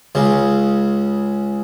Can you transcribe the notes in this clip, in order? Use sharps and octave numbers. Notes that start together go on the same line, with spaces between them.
C#2 C#3